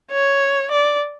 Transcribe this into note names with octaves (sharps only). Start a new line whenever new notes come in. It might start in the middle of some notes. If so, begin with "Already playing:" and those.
C#5
D5